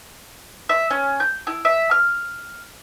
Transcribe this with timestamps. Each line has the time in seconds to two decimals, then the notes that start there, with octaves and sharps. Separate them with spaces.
0.69 E5
0.91 C#4
1.20 G6
1.47 E4
1.65 E5
1.91 F6